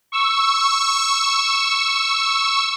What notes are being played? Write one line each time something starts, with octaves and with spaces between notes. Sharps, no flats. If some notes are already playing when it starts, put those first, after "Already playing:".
C#6 E6